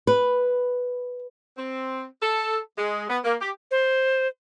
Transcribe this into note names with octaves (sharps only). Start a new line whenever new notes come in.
B4
C4
A4
G#3
B3
A#3
G4
C5